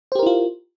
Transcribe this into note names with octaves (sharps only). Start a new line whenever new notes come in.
E4 F4 G4 A#4 C5